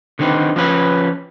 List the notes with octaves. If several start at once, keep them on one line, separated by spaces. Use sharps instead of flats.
D3 D#3 C4 D#4 B4
F3 C#4 B4